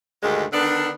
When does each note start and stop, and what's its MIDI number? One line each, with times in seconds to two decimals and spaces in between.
0.23 0.45 38
0.23 0.45 43
0.23 0.45 51
0.23 0.45 56
0.52 0.90 50
0.52 0.90 51
0.52 0.90 59
0.52 0.90 62